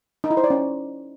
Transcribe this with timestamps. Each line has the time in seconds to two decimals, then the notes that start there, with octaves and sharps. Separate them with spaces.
0.24 D#4
0.31 E4
0.37 C5
0.44 D5
0.50 C#4